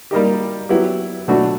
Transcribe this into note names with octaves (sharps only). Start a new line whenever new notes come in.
G3 A#3 D#4 G4
F#3 B3 E4 G4
B2 F#3 A3 D4 F#4